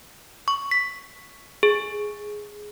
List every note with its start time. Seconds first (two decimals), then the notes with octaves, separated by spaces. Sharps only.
0.48 C#6
0.71 B6
1.63 G#4